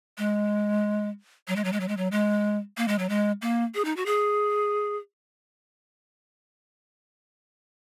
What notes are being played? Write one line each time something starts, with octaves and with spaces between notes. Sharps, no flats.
G#3
F#3
G#3
F#3
G#3
F#3
G#3
F#3
G#3
A#3
G#3
F#3
G#3
A#3
G#4
D#4
F#4
G#4